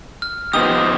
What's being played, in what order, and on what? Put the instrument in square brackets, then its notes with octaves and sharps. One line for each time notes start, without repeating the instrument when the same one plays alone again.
[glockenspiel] F6
[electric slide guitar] F3 B3 D#4 G4 [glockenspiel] D#6